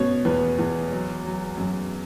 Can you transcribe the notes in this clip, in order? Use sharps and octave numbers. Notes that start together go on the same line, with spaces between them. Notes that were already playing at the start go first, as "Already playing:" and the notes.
Already playing: B2 C#4 C#5
E2 B4
E2
F#3
F#3
F#2